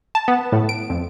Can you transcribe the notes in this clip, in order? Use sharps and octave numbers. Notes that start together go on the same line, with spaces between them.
A5
B3
A2
D7
F2